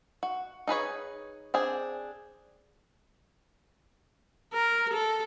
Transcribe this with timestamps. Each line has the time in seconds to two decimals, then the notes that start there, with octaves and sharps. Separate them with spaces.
0.23 F#4
0.67 D#4 G#4 B4 C#5
1.54 C4 D4 G#4
4.54 A#4
4.93 A4